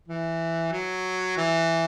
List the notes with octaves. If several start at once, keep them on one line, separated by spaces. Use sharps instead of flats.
E3
F#3
E3